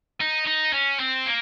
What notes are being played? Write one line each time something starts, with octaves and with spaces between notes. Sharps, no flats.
D#4
D#4
C#4
C4
A#3